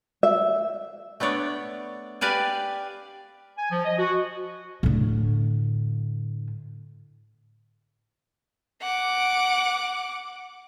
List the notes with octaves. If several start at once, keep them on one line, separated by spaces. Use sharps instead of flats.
E5
A3 B3 D4 C#5 D5
G4 B4 D5 F5 G#5
G#5
F3
D#5
F#4
A2 D3
F#5 D6